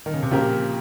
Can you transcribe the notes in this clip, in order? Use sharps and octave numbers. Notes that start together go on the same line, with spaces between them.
D#3
C#3
C3
A#2 C#3 F3 C4 G4 A#4